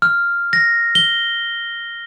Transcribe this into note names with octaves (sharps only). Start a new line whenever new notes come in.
F6
A#6
G7